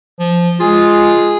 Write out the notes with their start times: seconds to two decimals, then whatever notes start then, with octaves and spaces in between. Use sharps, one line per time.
0.20 F3
0.60 G#3 F4 G#4